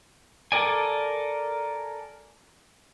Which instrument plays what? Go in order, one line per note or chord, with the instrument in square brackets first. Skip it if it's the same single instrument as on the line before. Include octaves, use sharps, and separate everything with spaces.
[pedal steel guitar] A4 A#4 D5 G#5